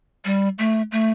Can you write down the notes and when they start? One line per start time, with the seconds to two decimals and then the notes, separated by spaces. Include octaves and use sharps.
0.25 G3
0.58 A3
0.92 A3